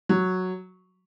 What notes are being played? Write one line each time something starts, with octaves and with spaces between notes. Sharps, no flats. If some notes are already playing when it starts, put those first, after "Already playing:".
F#3